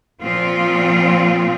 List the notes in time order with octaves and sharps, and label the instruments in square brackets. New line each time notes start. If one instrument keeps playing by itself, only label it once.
[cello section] A#2 F3 C4 F4